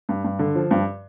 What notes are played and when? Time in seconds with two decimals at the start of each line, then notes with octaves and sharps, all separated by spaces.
0.09 G2
0.24 G2
0.39 D3
0.55 F3
0.71 G2